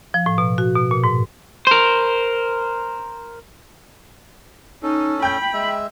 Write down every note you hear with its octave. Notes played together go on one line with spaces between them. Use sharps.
F3
A2
B2
F#4
B2
A#2
G#2
A#4 C5
C#4 D#4 A4
G5 B5 G6
G#3 E5